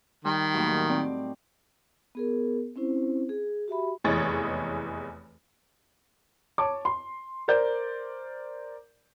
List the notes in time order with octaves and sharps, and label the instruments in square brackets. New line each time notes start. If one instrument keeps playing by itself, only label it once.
[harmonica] D#3 [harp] G3
[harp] D#2 A2 F#3
C4 D5
[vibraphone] B3 G#4 A#4
C4 C#4 E4 C5
G#4
F#4 G4 E5 B5
[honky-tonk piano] F1 E2 E3 G#3 C#5 A6
[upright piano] C#5 A5 D6
C6
A#4 C5 D5 G6